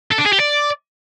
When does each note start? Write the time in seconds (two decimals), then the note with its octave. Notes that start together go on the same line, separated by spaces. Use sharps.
0.11 A4
0.18 D4
0.25 G#4
0.32 G4
0.40 D5